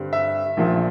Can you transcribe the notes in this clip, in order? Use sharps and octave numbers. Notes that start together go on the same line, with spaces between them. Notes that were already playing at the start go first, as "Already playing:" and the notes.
Already playing: G2 D3 G3 C4
E5
A#1 A#2 F3